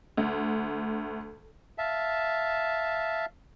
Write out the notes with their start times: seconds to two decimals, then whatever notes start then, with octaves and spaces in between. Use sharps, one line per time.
0.17 D2
1.78 E5 F5 A5